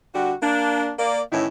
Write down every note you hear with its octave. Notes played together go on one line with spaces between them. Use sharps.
D3 G3 F#4
A#3 D4
A#3 D5
A2 D#3 E3 C#4 E4